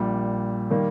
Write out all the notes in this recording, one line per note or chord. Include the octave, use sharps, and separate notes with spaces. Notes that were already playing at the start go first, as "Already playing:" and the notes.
Already playing: A#1 A#2 G3
D#3 G3 A#3